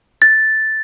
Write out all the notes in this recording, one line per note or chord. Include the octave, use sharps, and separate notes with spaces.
A6